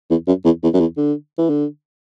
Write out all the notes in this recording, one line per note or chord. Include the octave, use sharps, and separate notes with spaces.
E2
F#2
E2
E2
F#2
E2
D3
E3
D3